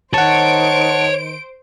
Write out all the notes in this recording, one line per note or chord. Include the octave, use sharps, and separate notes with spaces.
D#3 C5 C#5 F#5 A5 D7